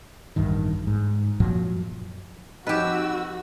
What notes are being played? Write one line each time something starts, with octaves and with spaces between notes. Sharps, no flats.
A1 E2 G2 D#3
G#2
F#2 A#2 F3 F#3
F2 D#4 F#4 G4 B4 D#5 E6